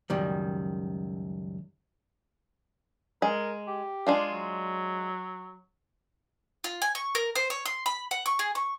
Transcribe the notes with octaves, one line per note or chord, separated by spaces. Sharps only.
C#2 F#2 D#3 G3
G#3 A#4
G4
G#3 D4 F4
F#3
F4
G#5
C#6
A#4
C5
C#5
C6
B5
F#5
C#6
G#4
C#6